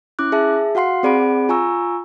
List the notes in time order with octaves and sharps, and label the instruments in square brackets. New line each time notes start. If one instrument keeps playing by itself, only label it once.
[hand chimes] C#4 E4 D6 F#6
G#4 E5 A5
F#4 F5 F#5 C6 C7
C4 G#4 D5 F#5 B5 D7
F4 G#5 A#5 C#6 E6